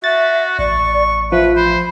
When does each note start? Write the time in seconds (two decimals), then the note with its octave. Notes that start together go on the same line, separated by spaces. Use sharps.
0.04 F#4 E5 A6
0.59 A1 D5 C#6
1.32 F3 B4 E5
1.56 C5 B5